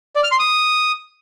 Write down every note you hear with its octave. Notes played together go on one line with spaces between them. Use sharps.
D5
F6
C6
D#6